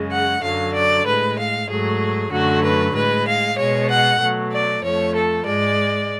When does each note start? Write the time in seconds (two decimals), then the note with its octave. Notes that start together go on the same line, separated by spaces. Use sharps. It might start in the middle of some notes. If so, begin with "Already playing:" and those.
Already playing: F#2 C#3 G#3
0.11 F#5
0.42 F#2 D3 F#3 F5
0.74 D5
1.05 A2 G#3 B4
1.37 F5
1.68 G#2 F#3 A3 G#4
2.31 F#2 D3 F#3 A3 F#4
2.62 B4
2.94 A2 G#3 B4
3.26 F5
3.57 B2 G#3 C#5
3.88 F#5
4.20 B2 F#3 A3
4.51 D5
4.83 F2 F3 A3 C#5
5.15 A4
5.45 G#2 G#3 D5